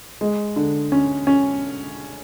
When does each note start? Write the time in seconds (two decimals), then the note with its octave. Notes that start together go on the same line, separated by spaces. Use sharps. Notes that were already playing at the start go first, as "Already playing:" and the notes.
0.21 G#3
0.56 D3
0.92 C#4
1.27 C#4